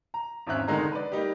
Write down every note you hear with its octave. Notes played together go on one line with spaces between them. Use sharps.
A#5
G#1 E2 C4 C#4 E5 F#6
F1 D3 D#3 G#3 D#4 A#5
B4 D5
G3 A#3 D#4 G4